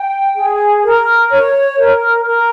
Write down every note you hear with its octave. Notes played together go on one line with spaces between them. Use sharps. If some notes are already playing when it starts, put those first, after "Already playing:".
Already playing: G5
G#4
A#4
C#5
A#4
A#4